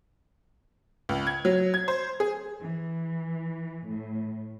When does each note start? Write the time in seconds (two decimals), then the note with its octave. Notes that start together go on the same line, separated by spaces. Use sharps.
1.09 C#2
1.27 G#6
1.45 F#3
1.74 G#6
1.88 C5
2.20 G#4
2.61 E3
3.87 A2